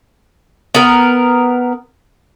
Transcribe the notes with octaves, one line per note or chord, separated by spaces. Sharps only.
B3 A#4